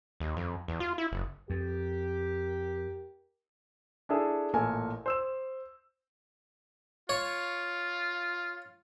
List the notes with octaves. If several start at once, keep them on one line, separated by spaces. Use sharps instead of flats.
D#2
F2
E2
F4
E4
F#1
F2 G4 A#4
D4 E4 G#4 A4
A1 A#2 A4 A#4 G#5
C5 E6 E7
F4 C#5